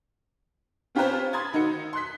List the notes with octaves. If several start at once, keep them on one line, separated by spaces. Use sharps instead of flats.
C4 C#4 F4 G4 B4 C5
B5 C6 D#6 G#6 A6
D#3 D#4 F#4 E6 C#7
C6 F#6 B6